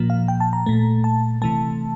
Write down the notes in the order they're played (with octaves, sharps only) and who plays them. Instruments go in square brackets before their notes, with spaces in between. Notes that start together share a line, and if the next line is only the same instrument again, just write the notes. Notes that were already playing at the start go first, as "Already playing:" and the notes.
Already playing: [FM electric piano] A#2 F3 A#3
F5
G5
A5
A#5
A#2 A3
A5
C3 E3 A3 A5